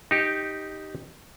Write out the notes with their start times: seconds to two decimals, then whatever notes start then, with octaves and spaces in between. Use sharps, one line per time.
0.11 D#4 G4